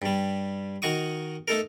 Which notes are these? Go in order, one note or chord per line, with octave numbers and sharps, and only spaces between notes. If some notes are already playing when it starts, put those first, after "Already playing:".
G2 G3
D#3 D#4 F#4 C#6 D#6
A3 D#4 A4 A#4